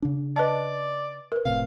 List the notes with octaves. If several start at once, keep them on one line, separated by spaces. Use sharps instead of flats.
C#3 D4
B4 D5 D#5 A5
A#4 B4
F1 A2 C3 F5